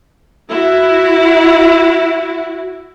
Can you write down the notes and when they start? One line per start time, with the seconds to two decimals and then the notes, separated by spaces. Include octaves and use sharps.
0.50 E4 F#4